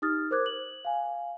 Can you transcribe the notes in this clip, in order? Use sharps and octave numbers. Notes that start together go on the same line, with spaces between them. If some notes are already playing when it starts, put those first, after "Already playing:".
D#4 G4 D#6 F6 A6
A#4 C5 D6 F#6 G#6
F#7
F5 G#5